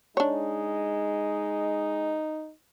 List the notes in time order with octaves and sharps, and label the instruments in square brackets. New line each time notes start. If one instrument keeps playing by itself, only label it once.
[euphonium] G#3 [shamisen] D4 C#5 [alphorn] D#4